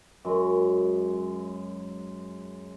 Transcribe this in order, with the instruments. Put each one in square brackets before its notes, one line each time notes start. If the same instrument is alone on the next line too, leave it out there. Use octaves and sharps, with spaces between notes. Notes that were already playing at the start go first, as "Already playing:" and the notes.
[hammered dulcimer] F#2 G#3